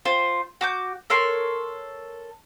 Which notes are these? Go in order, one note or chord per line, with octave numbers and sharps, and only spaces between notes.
F4 C5
F#4 D6 G6
A4 A#4 C#5 C6